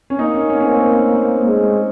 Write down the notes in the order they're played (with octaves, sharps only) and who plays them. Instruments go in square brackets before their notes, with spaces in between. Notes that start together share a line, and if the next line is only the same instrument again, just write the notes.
[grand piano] C#4
[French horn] A#3 [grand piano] D#4
[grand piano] C#4
C#4
C#4
C4
[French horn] G#3